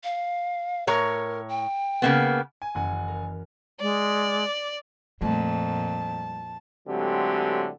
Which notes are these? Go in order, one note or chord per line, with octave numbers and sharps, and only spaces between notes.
F5
A2 A#4 C#5 A#5
G5
C#3 A#3 B3
G#5 G#6 D#7
F#1 F#2 E3 F#5 G#5
A#4
G#3 D5
F2 A#2 G3 A3 A5
A2 D3 F#3 G#3 C4 G4